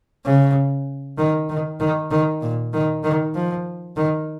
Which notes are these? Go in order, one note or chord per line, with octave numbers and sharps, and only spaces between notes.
C#3
D#3
D#3
D#3
D#3
A#2
D#3
D#3
F3
D#3